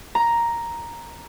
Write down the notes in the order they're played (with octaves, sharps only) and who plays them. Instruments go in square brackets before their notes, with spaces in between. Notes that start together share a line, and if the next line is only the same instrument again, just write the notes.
[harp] A#5